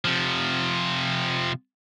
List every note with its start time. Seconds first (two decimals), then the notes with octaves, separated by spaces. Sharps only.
0.05 C3 F3